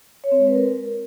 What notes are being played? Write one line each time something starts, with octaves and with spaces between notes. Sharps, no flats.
C#5
C4
G#3
B4
A#4